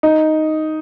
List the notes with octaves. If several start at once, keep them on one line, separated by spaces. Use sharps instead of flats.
D#4